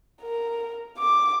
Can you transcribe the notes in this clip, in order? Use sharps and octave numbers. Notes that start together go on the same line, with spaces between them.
A#4
D6